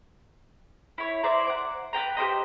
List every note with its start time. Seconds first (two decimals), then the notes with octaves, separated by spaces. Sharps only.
0.98 E4 C#5
1.23 E4 C5 D5 A#5
1.47 F#5 D6
1.93 B4 D#5 G5 A#5
2.17 G4 A#4 C5 D#5